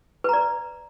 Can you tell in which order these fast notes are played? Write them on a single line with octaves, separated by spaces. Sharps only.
B4 A#5 D5